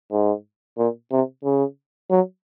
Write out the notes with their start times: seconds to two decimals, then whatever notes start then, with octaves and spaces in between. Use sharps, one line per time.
0.12 G#2
0.78 A#2
1.11 C3
1.44 C#3
2.10 F#3